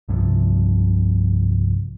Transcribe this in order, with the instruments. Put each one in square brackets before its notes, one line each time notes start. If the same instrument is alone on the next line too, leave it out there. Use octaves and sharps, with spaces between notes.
[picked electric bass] C2 G2 C3 F3